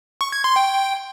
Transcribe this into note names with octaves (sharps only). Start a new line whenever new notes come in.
C#6
G#6
C6
G5